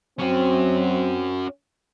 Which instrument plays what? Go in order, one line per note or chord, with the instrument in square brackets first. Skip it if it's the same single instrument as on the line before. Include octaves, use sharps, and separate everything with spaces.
[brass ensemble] F#3 C4 [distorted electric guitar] C#4 F#4